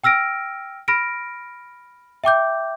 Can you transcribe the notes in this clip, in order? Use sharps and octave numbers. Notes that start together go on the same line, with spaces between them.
G5 E6 F6 A#6 D7
B5 F6 A#6 D7
E5 G5 D6 G6